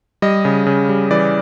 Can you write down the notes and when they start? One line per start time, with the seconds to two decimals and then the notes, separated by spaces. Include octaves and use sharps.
0.22 G3 D#5
0.45 C#3
0.66 C#3
0.89 G3
1.11 E3 D5